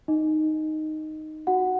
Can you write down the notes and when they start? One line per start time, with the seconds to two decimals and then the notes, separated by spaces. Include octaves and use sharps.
0.08 D#4 D#5
1.47 F#4 F#5